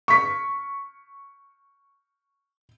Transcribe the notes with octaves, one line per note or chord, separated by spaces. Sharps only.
C#6 B6